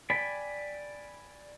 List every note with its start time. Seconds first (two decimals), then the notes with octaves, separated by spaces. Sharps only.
0.10 D5 G5 G#5 B5